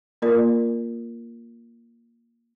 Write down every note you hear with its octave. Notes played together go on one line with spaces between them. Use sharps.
A#3 F4 A#4 D5